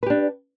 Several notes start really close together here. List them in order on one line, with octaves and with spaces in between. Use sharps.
B4 G4 D4